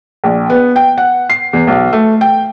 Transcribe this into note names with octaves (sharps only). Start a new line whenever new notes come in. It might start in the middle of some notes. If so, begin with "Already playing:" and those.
A#1
B3
G5
F#5
C7
E2
B1
A3
G5